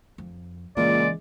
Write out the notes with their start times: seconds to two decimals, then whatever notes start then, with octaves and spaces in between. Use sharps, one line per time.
0.18 F2
0.77 C#2 A#2 E3 G#3 D5